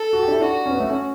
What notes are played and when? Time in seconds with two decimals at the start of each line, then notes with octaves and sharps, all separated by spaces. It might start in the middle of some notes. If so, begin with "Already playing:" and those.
Already playing: A4
0.13 F#4
0.23 G4
0.28 D4
0.32 E4
0.41 D4 F#4
0.66 C#4
0.70 B3
0.80 A3
0.90 C#4